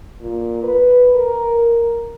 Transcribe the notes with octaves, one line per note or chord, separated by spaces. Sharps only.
A#2
B4
A#4